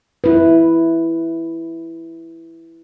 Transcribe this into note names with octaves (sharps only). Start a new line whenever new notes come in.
E4 B4